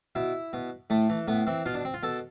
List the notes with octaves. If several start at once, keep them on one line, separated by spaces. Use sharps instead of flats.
B2 E4
B2
A2 A3
E3
A2 B3
E3 C4
B2 F4
D4
C4
F4
B2 A4